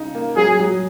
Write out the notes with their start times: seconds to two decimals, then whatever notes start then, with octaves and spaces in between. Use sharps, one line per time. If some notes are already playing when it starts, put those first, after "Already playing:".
Already playing: C#3 D#4
0.15 A#3
0.36 F#3 G#4
0.59 F#3